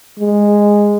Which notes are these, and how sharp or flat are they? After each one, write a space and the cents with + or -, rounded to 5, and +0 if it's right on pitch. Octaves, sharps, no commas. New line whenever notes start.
G#3 -10